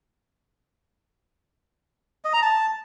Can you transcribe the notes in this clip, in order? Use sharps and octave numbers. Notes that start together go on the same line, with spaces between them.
D#5
A#5
A5